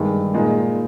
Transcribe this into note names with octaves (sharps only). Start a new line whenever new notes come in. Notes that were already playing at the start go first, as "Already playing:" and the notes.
Already playing: G2 D#3 G#3
A#2 G#3 D#4